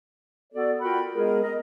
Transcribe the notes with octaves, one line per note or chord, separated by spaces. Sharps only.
B3 F#4 A4 D5
F4 F#4 A#4 F#5 G5 B5
G#3 B3 G#4 A#4
A#4 D#5